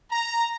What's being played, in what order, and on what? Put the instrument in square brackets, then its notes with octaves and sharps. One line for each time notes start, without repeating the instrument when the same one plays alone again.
[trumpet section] A#5